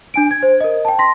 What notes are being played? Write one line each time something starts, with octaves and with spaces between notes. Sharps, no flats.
D4 G#5 D7
G#6
C5
A#4 D#5
G5 A5
C6 A#6 B6